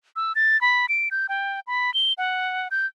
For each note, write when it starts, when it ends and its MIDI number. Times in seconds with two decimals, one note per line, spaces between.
0.16 0.33 88
0.35 0.59 93
0.61 0.86 83
0.89 1.09 98
1.11 1.27 91
1.29 1.60 79
1.67 1.93 83
1.94 2.13 103
2.18 2.68 78
2.71 2.86 91